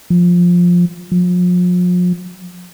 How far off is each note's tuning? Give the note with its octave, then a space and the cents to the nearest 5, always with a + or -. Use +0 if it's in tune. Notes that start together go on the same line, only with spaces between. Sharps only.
F3 +10
F3 +40